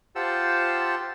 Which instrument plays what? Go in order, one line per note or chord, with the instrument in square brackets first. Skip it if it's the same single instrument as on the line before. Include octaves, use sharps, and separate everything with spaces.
[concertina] F4 G4 C5 F#5 A5 E6